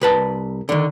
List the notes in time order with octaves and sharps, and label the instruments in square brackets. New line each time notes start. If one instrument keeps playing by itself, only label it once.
[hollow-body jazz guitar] C2 B4 A5
D3 D#3